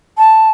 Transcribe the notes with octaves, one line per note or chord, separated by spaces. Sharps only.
A5